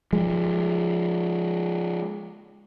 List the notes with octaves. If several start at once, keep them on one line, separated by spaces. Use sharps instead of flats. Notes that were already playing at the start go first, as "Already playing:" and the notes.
F3 G#3